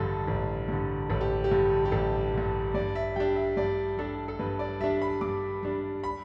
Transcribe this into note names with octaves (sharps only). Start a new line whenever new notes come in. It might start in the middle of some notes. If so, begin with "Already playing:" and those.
Already playing: A1 G2 D3 A4
A1
G2 D3
A1 A4
G4
G4
G2 D3
G4
A1 A4
G2 D3
G2 D5
E5
G3 D4 G5
E5
G2 D5
G3 D4 A4
A4
G2 B4
D5
G3 D4 E5
B5
G2 D6
G3 D4
B5